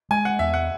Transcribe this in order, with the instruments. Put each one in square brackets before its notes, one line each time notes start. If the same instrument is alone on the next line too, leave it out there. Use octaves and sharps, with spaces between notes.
[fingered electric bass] G#3 [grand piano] G#5
[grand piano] F#5
[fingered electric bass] E2 [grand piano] E5
[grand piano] F#5